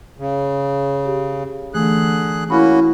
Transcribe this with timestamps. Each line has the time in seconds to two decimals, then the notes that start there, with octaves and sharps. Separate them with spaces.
0.18 C#3
1.05 G4
1.74 D3 E3 A3 G#4 F#6
2.50 A#3 C#4 E4 F#4 B5